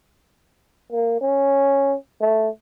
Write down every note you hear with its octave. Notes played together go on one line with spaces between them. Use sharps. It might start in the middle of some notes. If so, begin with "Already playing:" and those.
A#3
C#4
A3